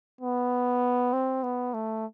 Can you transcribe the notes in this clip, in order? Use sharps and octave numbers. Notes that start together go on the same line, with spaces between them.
B3
C4
B3
A3